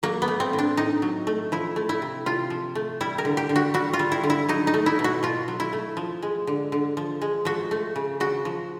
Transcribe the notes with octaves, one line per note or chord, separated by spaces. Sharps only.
F#3 A#3
B3
A3
C4
A2
D4
A2 D#4
F#3
A3
F3 E4
A3
E4
C3
C3 F4
F3
A3
G3 E4
A#4
D3
G4
D3
F#4
G3 F#4
F4
G3
E4
D3
E4
F#3 D#4
D#4
A3
E4
B2
F#4
B2 F4
F#3
E4
A3
F3
G#3
D3
D3
F3
G#3
F3 F#4
A3
C#3
C#3 F#4
F3